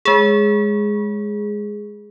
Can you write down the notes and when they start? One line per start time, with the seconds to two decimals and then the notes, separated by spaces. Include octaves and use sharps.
0.05 G#3 G#4